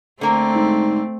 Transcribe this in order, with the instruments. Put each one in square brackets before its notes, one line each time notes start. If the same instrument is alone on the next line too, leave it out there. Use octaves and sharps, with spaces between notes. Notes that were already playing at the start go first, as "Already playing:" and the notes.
[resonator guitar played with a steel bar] D3 A#3 A#4 [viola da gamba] A3 C4
[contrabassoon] G#2